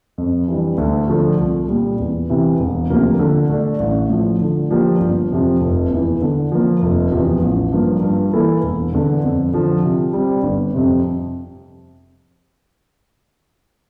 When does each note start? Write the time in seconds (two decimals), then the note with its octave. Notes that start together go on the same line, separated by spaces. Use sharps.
0.18 F2
0.48 E3 G3 D4
0.78 D2
1.08 D3 F3 A3
1.39 C2
1.68 A#2 G3
1.99 E2
2.30 C3 E3
2.60 E1
2.90 D2 C3 F3 A#3
3.19 D3
3.50 A3 D4
3.80 A1
4.10 A2 F3
4.41 D3
4.71 F3 A#3 D4 G4
5.00 G1
5.31 F2 C3 F3
5.61 F1
5.91 E2 E3
6.22 D3
6.52 F3 A#3
6.82 F1
7.12 E2 C3 F3
7.42 A1
7.72 G2 F3 A#3
8.03 G2
8.33 E3 A#3 E4 A4
8.63 E1
8.92 E2 D3
9.23 F2
9.53 D3 F3
9.83 C3
10.13 G3 C4
10.43 G1
10.74 F2 C3